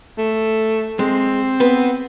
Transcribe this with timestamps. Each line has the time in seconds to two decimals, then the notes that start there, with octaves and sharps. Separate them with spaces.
0.18 A3
0.99 G#3 C4
1.60 B3 B4